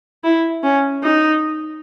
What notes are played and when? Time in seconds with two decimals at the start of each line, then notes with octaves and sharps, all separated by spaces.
0.24 E4
0.63 C#4
1.03 D#4